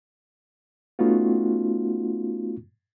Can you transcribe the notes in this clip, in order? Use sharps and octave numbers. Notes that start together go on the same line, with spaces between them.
A3 B3 C#4 D#4 F4 F#4